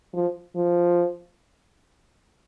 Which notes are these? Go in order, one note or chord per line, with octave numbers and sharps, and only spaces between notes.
F3
F3